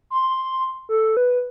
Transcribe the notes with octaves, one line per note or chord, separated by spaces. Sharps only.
C6
A4
B4